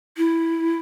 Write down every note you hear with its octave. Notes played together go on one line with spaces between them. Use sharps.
E4